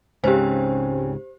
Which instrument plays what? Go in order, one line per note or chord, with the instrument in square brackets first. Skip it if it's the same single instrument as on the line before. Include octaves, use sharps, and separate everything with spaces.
[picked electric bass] C#2 G#2 C#3 [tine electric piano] C4 C#4 [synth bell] G4 C5